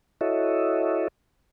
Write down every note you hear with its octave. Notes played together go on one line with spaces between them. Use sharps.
E4 F#4 A4 C#5 D#5 E5